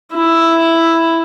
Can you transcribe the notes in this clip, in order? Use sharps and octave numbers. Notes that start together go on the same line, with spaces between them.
E4